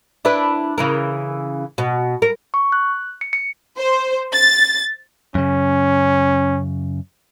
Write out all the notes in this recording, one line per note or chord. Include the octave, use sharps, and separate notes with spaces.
D4 E4 B4
C#3 E3 A#4
B2
A#4
C#6
F#6
C#7
C#7
C5
A6
F#2 C#3 C#4